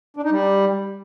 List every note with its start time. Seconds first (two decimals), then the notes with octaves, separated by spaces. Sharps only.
0.17 D4
0.24 D#4
0.31 G3